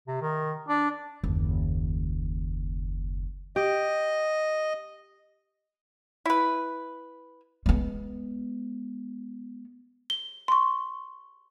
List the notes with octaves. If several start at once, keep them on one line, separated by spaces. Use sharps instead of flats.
C3
D#3
D4
F#1 D#2
G4 D#5
E4 B4
G#3 B3
G7
C6 C#6